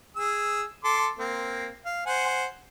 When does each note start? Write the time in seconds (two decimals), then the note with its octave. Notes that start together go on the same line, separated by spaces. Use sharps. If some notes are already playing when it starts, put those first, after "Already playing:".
0.16 G#4 E6
0.84 A4 C6 D6
1.19 A#3 C4
1.86 F5
2.06 C5 F#5 G#5